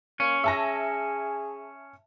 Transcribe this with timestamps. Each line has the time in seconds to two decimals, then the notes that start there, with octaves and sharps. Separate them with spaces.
0.20 A#3 C#4
0.44 G#4 E5 A5 A#6